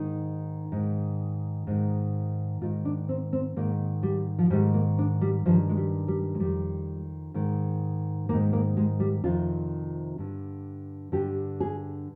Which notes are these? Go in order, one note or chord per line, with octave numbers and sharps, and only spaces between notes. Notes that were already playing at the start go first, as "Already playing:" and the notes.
Already playing: G#2 D#3 D#4
G#2 D#3
G#2 D#3
G#2 D#3 F4
D4
C4
C4
G#2 D#3 A#3
G3
F3
G#2 D#3 G3
A#3
D4
G3
G2 D#3 F3
G#3
G3
G3
G#3
F2 D#3 G3
G#2 D#3
G#2 D#3 A#3
A#3
G#3
G3
F2 C3 D#3 F4
G2 D3
G2 D3 G4
G#4